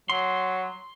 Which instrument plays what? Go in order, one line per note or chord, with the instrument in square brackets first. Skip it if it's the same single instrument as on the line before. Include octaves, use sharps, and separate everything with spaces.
[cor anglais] F#3 [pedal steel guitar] C6